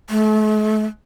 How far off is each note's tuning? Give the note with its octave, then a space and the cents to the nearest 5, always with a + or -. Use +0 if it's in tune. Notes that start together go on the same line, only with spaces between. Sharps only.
A3 -40